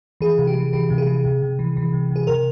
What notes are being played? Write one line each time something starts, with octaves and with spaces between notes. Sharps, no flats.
E3 G#4
C3
G4
E3
E3 G4
C3
G#4
E3
C3
C3
E3
E3
C3
C3 G#4
C3 A#4